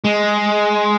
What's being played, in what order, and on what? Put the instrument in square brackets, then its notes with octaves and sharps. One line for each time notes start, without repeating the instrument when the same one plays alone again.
[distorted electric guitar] G#3